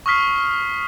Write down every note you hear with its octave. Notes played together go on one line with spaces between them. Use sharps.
C#6 D#6 F6 B6 C7